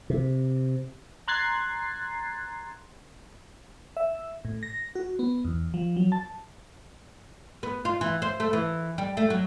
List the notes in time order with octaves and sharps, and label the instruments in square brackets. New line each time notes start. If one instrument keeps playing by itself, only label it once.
[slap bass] C3
[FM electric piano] A#5 C6 F#6 G#6 A6 C7
E5
A2
A#6
F#4
B3
E2
F3
F#3
A5
[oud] B3
F4
E3
C5
A3
E3
G3
A3
F#3